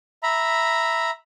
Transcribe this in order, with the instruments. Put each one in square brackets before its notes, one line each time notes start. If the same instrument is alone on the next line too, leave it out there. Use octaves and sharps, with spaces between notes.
[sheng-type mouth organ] E5 A#5 B5